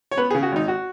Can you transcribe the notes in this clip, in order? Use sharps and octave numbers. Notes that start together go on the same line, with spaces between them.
C#5
B3 B4
G#4
C#3
F#4
G#1 D#4
F#4